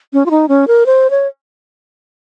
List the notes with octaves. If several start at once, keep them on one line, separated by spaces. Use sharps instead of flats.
C#4
F4
D#4
C#4
A#4
C5
C#5